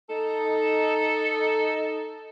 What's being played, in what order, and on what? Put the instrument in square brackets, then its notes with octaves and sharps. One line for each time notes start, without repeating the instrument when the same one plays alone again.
[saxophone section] D#4 A4